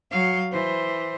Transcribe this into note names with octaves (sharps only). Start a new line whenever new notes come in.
F#3 F5
E3 C5